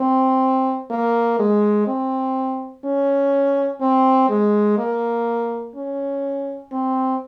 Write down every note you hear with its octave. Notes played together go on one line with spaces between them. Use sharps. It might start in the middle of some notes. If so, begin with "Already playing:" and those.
Already playing: C4
A#3
G#3
C4
C#4
C4
G#3
A#3
C#4
C4